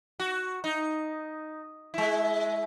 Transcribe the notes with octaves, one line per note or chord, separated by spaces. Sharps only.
F#4
D#4
G#3 E4